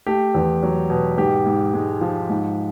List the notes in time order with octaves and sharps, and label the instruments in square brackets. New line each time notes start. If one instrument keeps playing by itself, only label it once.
[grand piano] A3 G4
E2
F#3
B2
G#2 G4
G#2
G#3
F3
G#2